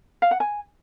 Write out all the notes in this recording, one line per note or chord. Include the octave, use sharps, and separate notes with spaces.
F5
F#5
G#5